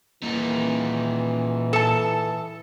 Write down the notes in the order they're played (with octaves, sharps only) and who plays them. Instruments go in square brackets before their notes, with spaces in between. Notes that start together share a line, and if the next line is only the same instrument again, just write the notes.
[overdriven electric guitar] A#2 D#4 [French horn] E3
[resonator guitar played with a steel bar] A4 A5